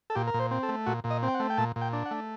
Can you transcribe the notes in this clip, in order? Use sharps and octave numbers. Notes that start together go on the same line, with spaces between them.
A4
A#2 G4
A#4
A#2
C5
C4
A4
A3
A#2 F#4
A#2
D#5
C4
G5
F#5
A3
G5
A#2 A5
A#2
G5
D4
F#5
A3